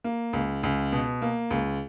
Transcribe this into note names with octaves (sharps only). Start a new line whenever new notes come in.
A#3
C#2
C#2
B2
A#3
C#2